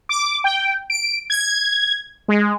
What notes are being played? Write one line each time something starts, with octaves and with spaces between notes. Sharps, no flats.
D6
G5
D7
G#6
G#3